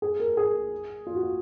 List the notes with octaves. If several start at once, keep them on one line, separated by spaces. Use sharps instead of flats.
G#4
A#4
G#4
F4
F#4
F4